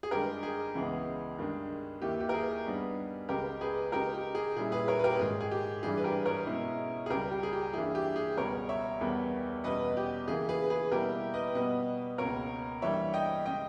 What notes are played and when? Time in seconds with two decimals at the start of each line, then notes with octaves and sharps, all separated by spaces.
0.03 G#4
0.11 G2 D#3 G#3 G4 A#4
0.43 G#4
0.75 C#2 C#3 E3 G#3 B3
1.39 G2 D#3 G#3
2.02 D#2 D#3 A#3 E4 G4
2.20 G4
2.29 A#4
2.34 G#4
2.66 G2 G3 B3 D#4
3.29 C#2 C#3 G#3 G4 A#4
3.61 G#4 B4
3.92 C#3 G#3 D#4 G4 A#4
4.14 G4
4.35 G#4
4.56 A#2 G3 C#4 E4 G#4
4.72 G#4 B4
4.88 A#4 C#5
4.99 B4
5.04 G4 A#4
5.19 G#2 D#3 G#3 G#4
5.40 G#4
5.51 G4
5.83 G2 E3 G3 G#4
5.97 B4
6.04 G4 A#4
6.26 A#4 C#5
6.46 B2 G#3 C#4 E4
7.06 G#4
7.10 C#2 C#3 G3 G4 A#4
7.31 G4
7.43 G#4
7.53 G4
7.73 G2 E3 A#3 E4 G#4
7.95 G4
8.16 G#4
8.37 C#2 B2 G3 A#4 C#5
8.69 C#5 E5
9.01 E2 D#3 G3 B3
9.64 E2 B2 G3 C#4 B4 D#5
9.97 G4
10.28 C#3 E3 A#3 G#4
10.49 G#4 B4
10.70 G#4 B4
10.91 B2 G3 A#3 E4 G4 A#4
11.34 B4 D#5
11.55 B2 G3 B3 B4 D#5
12.18 C#2 B2 A#3 A#4 C#5
12.82 G2 E3 G3 A#3 C#5 E5
13.13 D#5 G5
13.45 C#3 G#3 D#5 G5